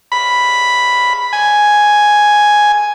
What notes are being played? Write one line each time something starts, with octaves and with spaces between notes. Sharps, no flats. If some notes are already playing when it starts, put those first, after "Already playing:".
B5
G#5